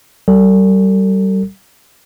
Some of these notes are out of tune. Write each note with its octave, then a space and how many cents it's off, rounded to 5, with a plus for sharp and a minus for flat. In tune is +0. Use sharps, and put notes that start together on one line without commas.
G3 -30 A4 +40